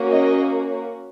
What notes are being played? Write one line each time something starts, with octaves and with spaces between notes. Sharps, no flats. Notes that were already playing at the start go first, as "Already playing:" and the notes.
Already playing: A#3 C#4 F#4
D#5